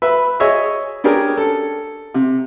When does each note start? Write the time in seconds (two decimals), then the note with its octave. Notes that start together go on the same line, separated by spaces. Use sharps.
0.02 B4 E5
0.40 G#4 C#5 D#5 E5
1.04 C#4 D4 G4 G#4 A#4
1.37 A4
2.14 C3